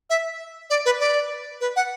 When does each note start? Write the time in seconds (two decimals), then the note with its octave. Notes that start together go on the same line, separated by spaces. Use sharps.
0.10 E5
0.70 D5
0.86 B4
1.00 D5
1.61 B4
1.76 F#5